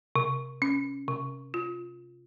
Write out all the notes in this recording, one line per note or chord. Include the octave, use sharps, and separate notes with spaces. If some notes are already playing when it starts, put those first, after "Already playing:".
C3
C#4
C3
F4